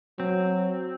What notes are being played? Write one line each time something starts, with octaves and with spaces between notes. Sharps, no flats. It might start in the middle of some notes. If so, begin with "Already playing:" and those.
F#3 C4